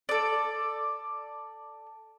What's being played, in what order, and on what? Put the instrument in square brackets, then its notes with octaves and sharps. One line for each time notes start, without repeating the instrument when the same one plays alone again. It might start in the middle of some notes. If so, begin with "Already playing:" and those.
[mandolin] A4 D5